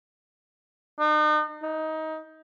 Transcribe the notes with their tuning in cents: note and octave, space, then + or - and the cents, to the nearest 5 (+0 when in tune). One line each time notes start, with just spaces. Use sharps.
D#4 -45
D#4 +20